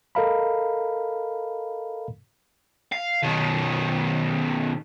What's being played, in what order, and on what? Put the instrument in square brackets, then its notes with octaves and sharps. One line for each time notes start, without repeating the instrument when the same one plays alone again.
[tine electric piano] A4 A#4 D#5 F5 A#5 B5
[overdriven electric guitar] F5
B2 D#3